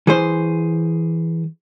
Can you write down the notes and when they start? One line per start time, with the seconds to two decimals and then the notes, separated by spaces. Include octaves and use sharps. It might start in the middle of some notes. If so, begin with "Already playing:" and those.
0.07 E3 G#4 C5